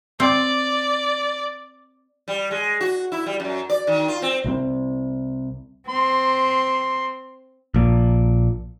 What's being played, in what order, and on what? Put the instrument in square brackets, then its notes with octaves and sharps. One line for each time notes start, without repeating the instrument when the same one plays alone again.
[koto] C4 [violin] D5
[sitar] G3
G#3
F#4
E4
G3
F#2
D5
D#3
F4
C4
[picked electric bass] C2 F3 C4
[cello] C4 [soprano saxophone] C6
[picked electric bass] A#1 A#2